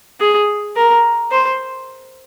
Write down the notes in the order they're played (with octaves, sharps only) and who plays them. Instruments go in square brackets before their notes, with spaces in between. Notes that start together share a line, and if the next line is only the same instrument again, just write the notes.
[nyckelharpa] G#4
A#4
C5